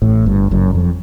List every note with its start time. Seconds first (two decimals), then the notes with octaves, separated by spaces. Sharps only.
0.02 A1 A2
0.26 G1 G2
0.51 F#1 F#2
0.75 F2